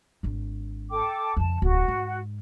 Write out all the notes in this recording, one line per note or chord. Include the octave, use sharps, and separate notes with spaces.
G#1 D4
A4 G5 D6
F2 C#3 A5
D1 C2 F#4
G#2